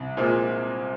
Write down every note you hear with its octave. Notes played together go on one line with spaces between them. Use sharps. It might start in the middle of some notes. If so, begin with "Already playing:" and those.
Already playing: C2
A#2 F3 G#3